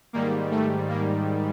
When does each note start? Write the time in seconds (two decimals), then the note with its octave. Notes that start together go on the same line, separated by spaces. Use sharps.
0.13 G#2 D#3 G3 A#3
0.51 A3
0.89 A#3